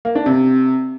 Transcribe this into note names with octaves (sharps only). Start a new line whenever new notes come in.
A#3
D4
C3